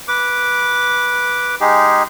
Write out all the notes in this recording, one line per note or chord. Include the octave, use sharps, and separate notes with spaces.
B4 D6
G#3 D#4 G4 G#4